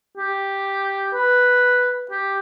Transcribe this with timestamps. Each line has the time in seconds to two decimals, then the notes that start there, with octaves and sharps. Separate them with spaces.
0.17 G4
1.14 B4
2.11 G4